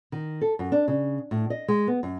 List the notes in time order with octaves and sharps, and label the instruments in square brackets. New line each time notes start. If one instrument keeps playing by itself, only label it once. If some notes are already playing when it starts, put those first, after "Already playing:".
[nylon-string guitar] D#3
A4
F#2
D4
C#3
A2
D#5
G#3
B3
F#2